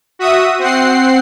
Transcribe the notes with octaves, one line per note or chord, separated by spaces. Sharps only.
F#4 E5 D#6
C4 F#5 C7